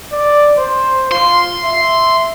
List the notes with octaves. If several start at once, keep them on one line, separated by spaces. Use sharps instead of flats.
D5
C5
F4 C6
E5